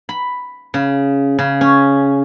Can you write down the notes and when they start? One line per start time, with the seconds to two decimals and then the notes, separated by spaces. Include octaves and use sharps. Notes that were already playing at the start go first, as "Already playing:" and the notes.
0.09 B5
0.74 C#3
1.39 C#3
1.61 C#4